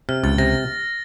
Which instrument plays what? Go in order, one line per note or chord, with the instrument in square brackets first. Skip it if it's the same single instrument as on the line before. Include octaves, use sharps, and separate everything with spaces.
[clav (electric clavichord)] C3 [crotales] F6
[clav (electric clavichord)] C#2 [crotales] A6
[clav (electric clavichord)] C3 [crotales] A#6